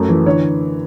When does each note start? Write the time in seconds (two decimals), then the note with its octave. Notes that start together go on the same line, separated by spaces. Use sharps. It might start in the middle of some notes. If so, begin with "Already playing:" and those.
Already playing: F#2 A3
0.09 E3
0.26 D3 C#5